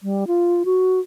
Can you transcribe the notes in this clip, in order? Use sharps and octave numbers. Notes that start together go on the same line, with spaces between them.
G3
F4
F#4